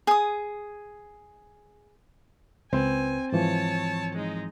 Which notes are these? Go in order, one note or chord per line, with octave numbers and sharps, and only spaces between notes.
G#4 D#6
C#2 C4 B4 G#5
G#2 E3 F3 C#5 A5
G#3 D#4